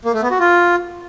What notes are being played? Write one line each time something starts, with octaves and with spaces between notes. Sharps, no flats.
A#3
A3
B3
F#4
F4